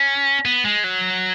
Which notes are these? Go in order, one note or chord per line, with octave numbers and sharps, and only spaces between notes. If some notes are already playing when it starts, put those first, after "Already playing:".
Already playing: C#4
B3
G#3
F#3